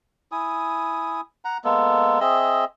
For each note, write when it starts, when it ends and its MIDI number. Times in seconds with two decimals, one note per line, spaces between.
0.32 1.21 64
0.32 1.21 80
0.32 1.21 87
1.45 1.58 78
1.45 1.58 82
1.64 2.19 56
1.64 2.19 58
1.64 2.19 59
1.64 2.19 69
2.20 2.65 60
2.20 2.65 68
2.20 2.65 75
2.20 2.65 76